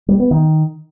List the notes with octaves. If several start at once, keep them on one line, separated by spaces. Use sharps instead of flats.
G3
B3
D#3